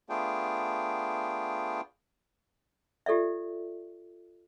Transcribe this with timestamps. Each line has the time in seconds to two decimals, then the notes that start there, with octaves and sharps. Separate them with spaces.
0.09 A3 B3 D4 F4 G#4 G5
3.06 F4 G4 A4 D5 E5